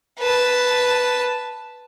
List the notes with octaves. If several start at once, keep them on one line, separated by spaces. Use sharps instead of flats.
B4 A5